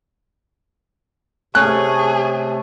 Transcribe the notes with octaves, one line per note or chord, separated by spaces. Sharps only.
C3 A3 C#4 G#4 F#6